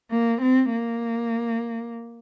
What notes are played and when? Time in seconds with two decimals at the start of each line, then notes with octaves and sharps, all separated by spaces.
0.11 A#3
0.42 C4
0.73 A#3